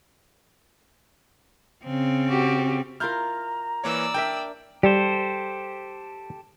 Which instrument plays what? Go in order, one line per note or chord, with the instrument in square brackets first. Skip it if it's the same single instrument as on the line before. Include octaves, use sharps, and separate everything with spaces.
[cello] C#3 C4
[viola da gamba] F#4 G4
[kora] E4 F4 A#4 [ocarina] A#5 [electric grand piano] F6 G6
[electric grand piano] E3 A#3 C#5 [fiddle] D5 E6
[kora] D4 A#4 E5 [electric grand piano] G5
[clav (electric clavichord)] G3 [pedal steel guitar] G4 A4 C5